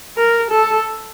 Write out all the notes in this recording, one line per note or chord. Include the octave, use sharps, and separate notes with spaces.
A#4
A4